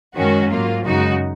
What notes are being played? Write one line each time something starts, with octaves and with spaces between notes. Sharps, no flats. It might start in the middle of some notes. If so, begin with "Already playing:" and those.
F#2 D#3 G#3 C#4 F#4
G#2 F#3 A#3 F4
F#2 C#3 G#3 D#4 F#4